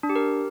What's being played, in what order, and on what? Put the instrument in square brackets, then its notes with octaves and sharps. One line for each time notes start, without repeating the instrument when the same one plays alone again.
[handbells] D4
G4
A#4